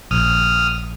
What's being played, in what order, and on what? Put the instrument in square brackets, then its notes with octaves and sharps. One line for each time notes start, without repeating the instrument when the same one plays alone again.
[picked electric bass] A#1 [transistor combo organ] D#6 F6